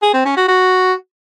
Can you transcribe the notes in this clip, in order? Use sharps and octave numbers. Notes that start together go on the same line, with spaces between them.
G#4
C4
C#4
F#4
F#4